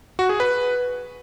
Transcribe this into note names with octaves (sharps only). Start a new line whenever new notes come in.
F#4
G#4
B4